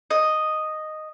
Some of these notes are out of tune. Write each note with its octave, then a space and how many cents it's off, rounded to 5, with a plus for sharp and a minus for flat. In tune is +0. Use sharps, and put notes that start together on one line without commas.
D#5 -5